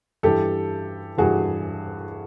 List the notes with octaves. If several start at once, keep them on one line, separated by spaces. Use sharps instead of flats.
G2 E3 G4 A4
G2 E3 F#4 G#4